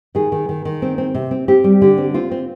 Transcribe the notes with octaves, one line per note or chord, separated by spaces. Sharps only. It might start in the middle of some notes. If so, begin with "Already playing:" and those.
D#3 G#4
D#3
D#3
D#3
C4
C4
C3
C4
C4 G4
G3
D3 G4
C4
C4 F4
C4